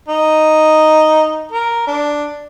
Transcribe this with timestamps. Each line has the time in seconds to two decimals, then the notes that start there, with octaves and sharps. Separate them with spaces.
0.09 D#4
1.51 A#4
1.87 D4